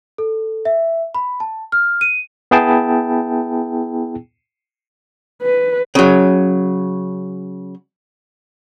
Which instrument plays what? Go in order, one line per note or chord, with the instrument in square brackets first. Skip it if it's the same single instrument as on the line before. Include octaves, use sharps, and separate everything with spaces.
[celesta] A4
E5
B5
A5
F6
D#7
[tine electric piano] B3 E4 G#4 G5 A5
[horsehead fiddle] B4
[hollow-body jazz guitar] C#3 F#3